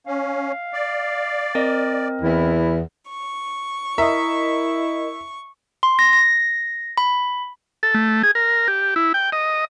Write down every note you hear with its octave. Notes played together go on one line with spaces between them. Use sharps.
C#4 F5
D5
C4 A#4 D#5
E2 E4
C#6
E4 A#4 D#5 E5
C6
A#6
A#6
B5
A4
A3
G#4
A#4
G4
E4
G5
D#5